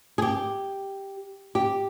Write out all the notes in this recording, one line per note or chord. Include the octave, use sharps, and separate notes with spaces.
G#4
G4
G4